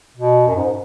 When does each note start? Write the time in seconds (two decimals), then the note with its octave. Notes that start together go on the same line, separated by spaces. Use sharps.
0.17 B2
0.47 F#2
0.56 G#2